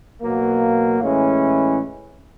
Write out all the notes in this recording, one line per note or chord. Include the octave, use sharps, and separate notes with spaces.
B2 F#3 A#3
A2 E3 G#3 C#4 E4